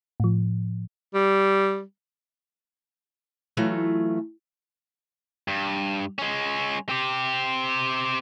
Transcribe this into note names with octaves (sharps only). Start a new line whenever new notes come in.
A2 F3
G3
E3 F#3 A3 F4
G2
G#3 C#4
C4 G4